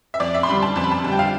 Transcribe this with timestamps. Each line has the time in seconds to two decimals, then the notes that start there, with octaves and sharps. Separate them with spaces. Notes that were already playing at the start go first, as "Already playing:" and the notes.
0.14 E5
0.20 F2 D5
0.34 E5
0.43 C6
0.48 D3 G3 B5
0.62 A5
0.76 F2 A5
0.84 B5
0.92 A5
1.04 D3 A5
1.08 G3 G5
1.19 F5